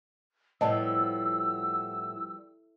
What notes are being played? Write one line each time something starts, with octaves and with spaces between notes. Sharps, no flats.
A2 F3 G3 B3 D#5 A5 E6